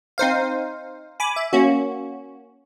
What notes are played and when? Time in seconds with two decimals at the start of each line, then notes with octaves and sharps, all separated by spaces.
0.18 C4 D#4 C5 F5
1.20 G#5 B5 D6
1.36 E5
1.53 A#3 C#4 F#4